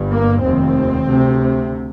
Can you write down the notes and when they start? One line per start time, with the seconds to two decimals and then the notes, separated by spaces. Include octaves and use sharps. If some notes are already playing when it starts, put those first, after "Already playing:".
Already playing: G1 G2
0.10 A#3
0.43 F1 D#2 C4
1.08 D2 C3